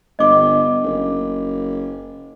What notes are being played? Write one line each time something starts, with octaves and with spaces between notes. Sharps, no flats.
G1 D#5 D6
F#1